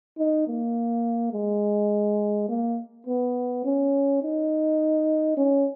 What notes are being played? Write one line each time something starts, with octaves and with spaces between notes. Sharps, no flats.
D#4
A#3
G#3
A#3
B3
C#4
D#4
C#4